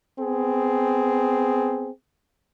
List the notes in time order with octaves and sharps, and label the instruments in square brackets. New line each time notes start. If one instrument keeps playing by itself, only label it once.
[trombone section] B3 C4 G#4